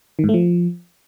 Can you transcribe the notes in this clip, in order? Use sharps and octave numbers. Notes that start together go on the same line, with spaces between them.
D#3
G#2
A3
F3